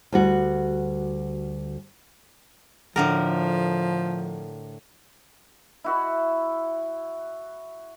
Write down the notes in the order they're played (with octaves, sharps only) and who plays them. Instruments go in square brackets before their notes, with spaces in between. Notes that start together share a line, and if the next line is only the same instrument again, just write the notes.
[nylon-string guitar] D2 G3 F#4
[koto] A2 D3 A#4 [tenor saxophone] F3
[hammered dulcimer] E4 F#4 E5